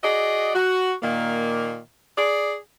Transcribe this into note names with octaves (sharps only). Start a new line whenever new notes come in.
F#4 G#4 D5 D#5
F#4
A#2 D#3 A#3
G#4 D5